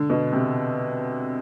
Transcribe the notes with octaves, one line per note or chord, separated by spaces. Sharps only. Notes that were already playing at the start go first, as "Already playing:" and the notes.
Already playing: D3
B2
C3